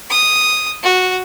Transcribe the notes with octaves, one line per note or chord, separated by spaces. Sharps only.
D#6
F#4